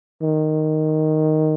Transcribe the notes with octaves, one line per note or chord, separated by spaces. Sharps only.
D#3